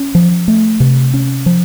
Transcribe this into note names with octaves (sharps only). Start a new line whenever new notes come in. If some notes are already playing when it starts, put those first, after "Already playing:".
Already playing: C#4
F3
A3
C3
C#4
F3